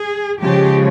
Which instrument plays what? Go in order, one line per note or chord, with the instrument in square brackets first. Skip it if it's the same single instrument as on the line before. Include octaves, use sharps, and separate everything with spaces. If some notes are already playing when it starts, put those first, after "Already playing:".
Already playing: [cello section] G#4
C#3 F3 G#3 G4